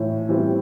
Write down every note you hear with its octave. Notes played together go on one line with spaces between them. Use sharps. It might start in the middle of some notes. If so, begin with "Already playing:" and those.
Already playing: A2 E3 E4
E3 G3 C4 E4